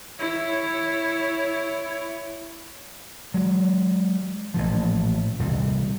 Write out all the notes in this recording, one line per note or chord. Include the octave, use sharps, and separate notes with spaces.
E4 C#5
F#3 G#3
A1 A#2 F3
D#1 C2